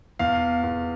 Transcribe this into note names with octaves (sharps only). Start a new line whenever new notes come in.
E2 F5
E2